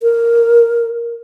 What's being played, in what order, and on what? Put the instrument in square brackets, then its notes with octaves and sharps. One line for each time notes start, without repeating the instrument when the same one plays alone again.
[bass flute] A#4